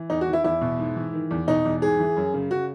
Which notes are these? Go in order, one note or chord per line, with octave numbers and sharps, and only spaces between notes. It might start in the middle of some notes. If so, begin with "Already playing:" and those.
Already playing: E3
E2 D#4
F#4
D#3
E4
E2 E4
B2
G#2
E3
D#3
E2
B2 D#4
E2
G#2 G#4
E3
F#2
C#3
C#3 F#4